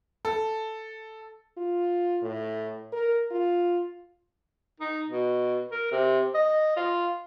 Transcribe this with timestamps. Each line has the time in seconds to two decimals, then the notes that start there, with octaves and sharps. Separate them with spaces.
0.25 A4
1.57 F4
2.22 A2
2.92 A#4
3.31 F4
4.80 D#4
5.10 B2
5.71 A#4
5.92 C3
6.34 D#5
6.77 F4